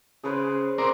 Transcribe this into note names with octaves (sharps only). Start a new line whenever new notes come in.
C#3 G#4 B4 C5
C4 A#4 D5